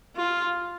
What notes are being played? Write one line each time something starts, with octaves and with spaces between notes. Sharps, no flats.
F4